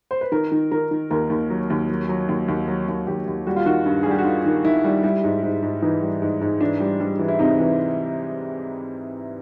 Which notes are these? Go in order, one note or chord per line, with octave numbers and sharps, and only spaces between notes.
C5
B4
D#3 A#4
D#3
D#3 A#4
D#3
D#2 A#4
D#2
F#3
D#2
F#3
F#3
D#2
D#2
F#3
D#2
D#2 G4
D#2
G3 F#4
F4
D#3 F#4
G2
G#4
G3
G4
F#4
D#3 F4
D#3
D#3 E4
G3
G3 E4
G#2
G#2
G#2
E3 D#4
G3
G#2
G#2
E3 D4
G3
G3 D4
E3
E4
C3 D#4
E3